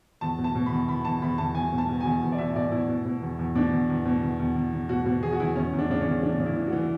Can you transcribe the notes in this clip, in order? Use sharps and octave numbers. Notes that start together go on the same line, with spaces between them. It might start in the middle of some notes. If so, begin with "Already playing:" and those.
E2 A5
B2
A5
B2
B5
E2
E2 B5
E2 A5
E2 B5
E2 A5
E2 G#5
B2
A5
B2
E2 G#5
E2
D5
B2 E5
B2 D5
B2 E4
B2
B2
E2
E2
B2 D4
E2
E2
B2
E2
E2
E2
E2
B2 F#4
B2 F#4
E2 G#4
F#4
E2 E4
E2 C#4
E2
D4
C#3 D4
C#4
E2
E3 D4
C#3
E4
E3
F#4
E3